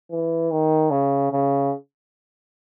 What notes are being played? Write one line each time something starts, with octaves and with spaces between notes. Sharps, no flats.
E3
D#3
C#3
C#3